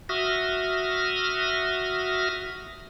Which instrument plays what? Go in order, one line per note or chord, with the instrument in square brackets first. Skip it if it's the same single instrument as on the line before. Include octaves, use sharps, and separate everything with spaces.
[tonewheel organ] F#4 E5 D#6 F6